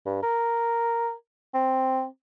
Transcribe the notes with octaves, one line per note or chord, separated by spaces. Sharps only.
G2
A#4
C4